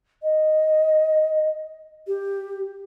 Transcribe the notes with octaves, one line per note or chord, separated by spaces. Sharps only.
D#5
G4